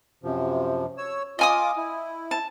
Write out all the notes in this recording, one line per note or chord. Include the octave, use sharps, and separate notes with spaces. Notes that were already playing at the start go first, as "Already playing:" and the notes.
F#2 C3 F3
C#5 E6
F4 D#5 G#5 D6 D#6
E4
A5